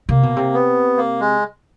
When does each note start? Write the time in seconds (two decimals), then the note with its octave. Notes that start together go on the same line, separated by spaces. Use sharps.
0.09 C3 A#3
0.23 B2
0.36 C3
0.54 B3
0.97 A#3
1.20 G#3